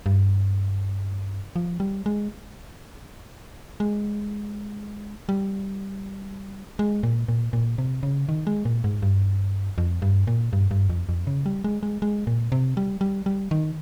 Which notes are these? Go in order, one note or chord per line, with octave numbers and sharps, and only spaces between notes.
G2
F3
G3
G#3
G#3
G3
G#3
A#2
A#2
A#2
C3
C#3
D#3
G#3
A#2
G#2
G2
F2
G2
A#2
G2
G2
F2
F2
C#3
G3
G#3
G#3
G#3
A#2
C3
G3
G3
G3
D#3